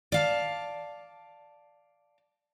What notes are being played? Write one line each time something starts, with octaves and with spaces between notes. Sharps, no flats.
D5 F5 A5